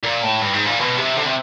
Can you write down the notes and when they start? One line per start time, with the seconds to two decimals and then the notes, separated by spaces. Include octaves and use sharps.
0.03 A#2
0.23 A2
0.42 G2
0.54 G#2
0.66 A#2
0.79 B2
0.97 C3
1.17 D3
1.25 C3